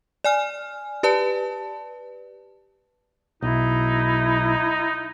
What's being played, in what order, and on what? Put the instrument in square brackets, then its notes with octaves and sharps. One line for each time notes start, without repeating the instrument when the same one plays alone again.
[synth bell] D5 G#5 F6
G4 B4 D5 A5
[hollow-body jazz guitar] B1 [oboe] D#4 [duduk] E4